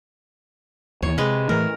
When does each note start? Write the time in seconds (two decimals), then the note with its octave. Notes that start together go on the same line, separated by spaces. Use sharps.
1.02 D#2 E3 C#5
1.18 C3 G#3 B4
1.49 A2 E3 A3 A#4